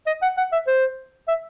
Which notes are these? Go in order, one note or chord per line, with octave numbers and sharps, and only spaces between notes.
D#5
F#5
F#5
E5
C5
E5